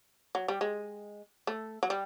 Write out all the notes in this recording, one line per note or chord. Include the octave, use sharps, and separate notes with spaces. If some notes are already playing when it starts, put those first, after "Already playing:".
F#3
G3
G#3
A3
F#3
G3